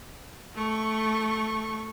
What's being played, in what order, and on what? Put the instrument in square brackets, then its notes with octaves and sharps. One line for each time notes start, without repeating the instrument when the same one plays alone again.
[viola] A3 C#6